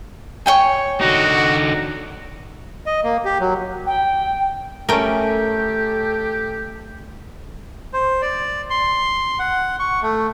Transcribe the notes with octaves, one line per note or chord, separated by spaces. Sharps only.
C#5 G5 G#5
D3 D#4 F#4
D#5
A#3
G4
F#3
G5
A3 C#4 G4 A4 A#4 G5
C5
D5
C6
F#5
C#6
A3